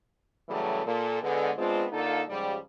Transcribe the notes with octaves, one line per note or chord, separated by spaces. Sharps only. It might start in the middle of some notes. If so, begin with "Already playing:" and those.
C#3 E3 F#3 G3 A3 A4
A#2 A4
D3 G#3 B3
G#3 B3 C4 D4 F4
D3 A#3 D#4 F4 A4
G#2 C#3 F3 G3